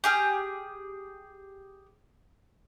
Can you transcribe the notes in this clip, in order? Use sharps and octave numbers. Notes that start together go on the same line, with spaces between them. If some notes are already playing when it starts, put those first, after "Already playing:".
G4 G#4 F6